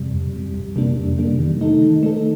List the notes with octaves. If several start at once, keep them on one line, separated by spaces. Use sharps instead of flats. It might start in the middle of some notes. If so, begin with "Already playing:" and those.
Already playing: F2 C3 G3
F2
C3 G3
F2
C3 G3 A#3 D4
F2
C3 G3 A#3 D4
D#3
A3 D#4 A4
D#3
A3 D#4 A4